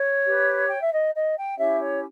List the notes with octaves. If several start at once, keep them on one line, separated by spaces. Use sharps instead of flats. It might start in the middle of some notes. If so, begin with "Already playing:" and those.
Already playing: C#5
G4 B4
G5
E5
D#5
D#5
G5
C#4 E4 G4 C#5 E5
C#5